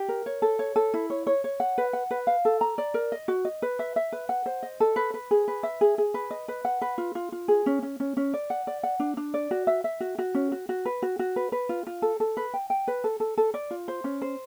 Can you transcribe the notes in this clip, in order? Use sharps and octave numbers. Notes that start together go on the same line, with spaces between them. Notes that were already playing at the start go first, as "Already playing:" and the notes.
Already playing: G4
A#4
C#5
A4
C#5
A4
E4
C#5
C#5
C#5
F#5
B4
F#5
B4
F5
A4
A#5
D5
A#4
D#5
F#4
D#5
B4
E5
E5
B4
F#5
C5
D#5
A4
B4
B4
G#4
B4
E5
G#4
G#4
B4
D#5
B4
F#5
B4
F4
F4
F4
G#4
C#4
C#4
C#4
C#4
D5
F#5
D5
F#5
D4
D4
D5
F#4
E5
E5
F#4
F#4
C#4
F#4
F#4
B4
F#4
F#4
B4
B4
F4
F4
A4
A4
B4
G5
G5
B4
A4
A4
A4
D5
F4
C5
C#4
C5